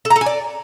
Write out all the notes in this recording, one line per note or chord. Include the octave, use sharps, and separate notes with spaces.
A4
A#5
A4
G#5
D5